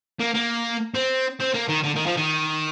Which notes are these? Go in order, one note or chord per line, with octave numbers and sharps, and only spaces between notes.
A#3
A#3
C4
C4
A#3
D#3
D3
D#3
F3
D#3